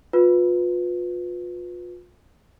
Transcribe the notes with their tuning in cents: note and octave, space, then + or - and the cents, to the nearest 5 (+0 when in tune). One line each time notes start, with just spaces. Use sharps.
F4 +35 B4 +0